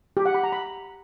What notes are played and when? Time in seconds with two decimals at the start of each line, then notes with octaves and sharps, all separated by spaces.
0.17 G4
0.26 F#5
0.35 B5
0.43 A#5
0.52 B5